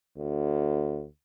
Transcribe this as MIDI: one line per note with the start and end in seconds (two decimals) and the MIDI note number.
0.17 1.05 38